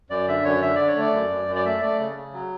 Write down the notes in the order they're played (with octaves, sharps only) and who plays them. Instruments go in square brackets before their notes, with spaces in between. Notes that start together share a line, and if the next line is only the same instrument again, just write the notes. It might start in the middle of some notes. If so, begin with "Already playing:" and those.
[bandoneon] F#2 D5
D3 E5
F#2 C#5
D3 E5
D3 D5
C#5
A3 D5
F#2
F#2
F#2
D5
A3 E5
A3 D5
C#3
C#3
F#3